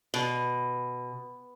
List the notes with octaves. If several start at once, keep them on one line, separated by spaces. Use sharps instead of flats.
B2